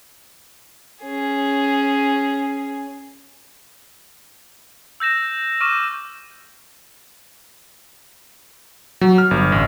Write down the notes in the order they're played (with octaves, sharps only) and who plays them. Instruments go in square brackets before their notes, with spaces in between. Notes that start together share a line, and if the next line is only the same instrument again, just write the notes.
[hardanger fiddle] C#4 G#4
[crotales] E6 G6 A#6 E7
C#6 D6 F6 D#7 E7
[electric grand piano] F#3
F6
G1
A1